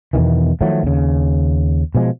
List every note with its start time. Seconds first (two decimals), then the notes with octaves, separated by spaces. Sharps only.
0.13 E2 B2 D#3 E3
0.61 D#3 F3 F#3 A3
0.83 D#2 C#3
1.95 B2 F3 G#3